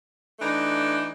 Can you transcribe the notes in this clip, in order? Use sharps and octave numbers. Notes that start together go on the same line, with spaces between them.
E3 A3 D4 D#4